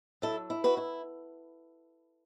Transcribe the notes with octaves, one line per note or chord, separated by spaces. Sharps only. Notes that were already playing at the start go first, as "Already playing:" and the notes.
F#3 E4 A4
E4
F#4 B4
E4